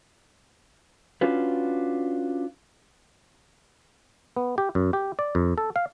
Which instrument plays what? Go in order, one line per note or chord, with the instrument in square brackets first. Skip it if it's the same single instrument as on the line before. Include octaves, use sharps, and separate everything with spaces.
[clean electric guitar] C#4 D4 F4 F#4 B4
[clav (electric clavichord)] B3
G4
F#2
G4
D5
F2
A4
F5